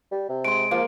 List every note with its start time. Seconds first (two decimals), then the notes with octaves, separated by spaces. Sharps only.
0.12 G3
0.29 C3
0.45 G#3 C6 D7
0.71 F3 A#3